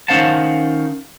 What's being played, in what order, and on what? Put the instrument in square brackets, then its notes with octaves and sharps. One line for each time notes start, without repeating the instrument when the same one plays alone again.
[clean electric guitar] D#3 C#4 C5 F5 F#5 A5